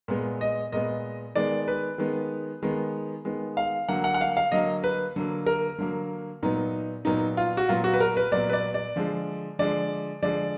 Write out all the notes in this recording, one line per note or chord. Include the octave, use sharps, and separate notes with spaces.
A#2 G#3 B3
D#5
A#2 G#3 B3 D#5
D#3 G#3 B3 D5
B4
D#3 G#3 B3
D#3 G#3 B3
D#3 G#3 B3
F5
D3 F#3 A#3 F#5
F#5
F#5
F5
F5
D3 F#3 A#3 D#5
B4
D3 F#3 A#3
A#4
D3 F#3 A#3
A#2 F#3 B3 D#4
A#2 F#3 B3 D#4
F4
F#4
A#2 F#3 B3 F4
F#4
B4
A#4
B4
A#2 F#3 B3 D5
B4
D5
D5
D3 F3 G#3
D3 F3 G#3 D5
D3 F3 G#3 D5